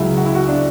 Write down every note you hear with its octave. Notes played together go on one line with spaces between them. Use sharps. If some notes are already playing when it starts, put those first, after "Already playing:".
Already playing: C#2 C#3 F#3 E4
F#4
E4
F#4
D4